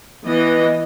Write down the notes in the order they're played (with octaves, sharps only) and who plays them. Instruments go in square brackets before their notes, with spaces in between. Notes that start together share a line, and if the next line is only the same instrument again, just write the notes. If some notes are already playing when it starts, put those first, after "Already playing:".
[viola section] E3 B3 D#5